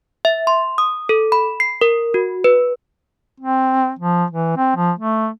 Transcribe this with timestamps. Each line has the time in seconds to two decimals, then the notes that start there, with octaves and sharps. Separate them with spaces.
0.25 E5
0.47 C6
0.78 D#6
1.09 A4
1.32 B5
1.60 C7
1.81 A#4
2.14 F#4
2.44 B4
3.40 C4
3.99 F3
4.30 E3
4.57 C4
4.76 F3
4.99 A3